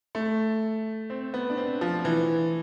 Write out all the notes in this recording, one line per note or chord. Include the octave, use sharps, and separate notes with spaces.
A3
C4
B3
D4
C4
F3
E3